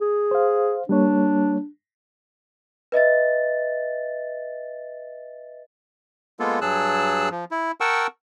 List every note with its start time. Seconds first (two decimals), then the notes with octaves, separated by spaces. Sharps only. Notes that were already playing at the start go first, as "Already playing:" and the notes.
0.01 G#4
0.31 C5 F5
0.89 G3 A#3 D4 C#5
2.92 B4 D#5 E5 A6
6.40 G#3 A#3 B3 F4 A4
6.61 G2 F#3 G#4 A5 E6 F#6
7.31 F3
7.51 E4
7.80 A#4 F#5 G5 A5 C#6 E6